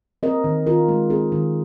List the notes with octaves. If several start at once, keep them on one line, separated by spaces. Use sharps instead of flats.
C4 A#4 D#5
D#3
D#3 F4 A#4
G#3
C4 D#4 G#4
D#3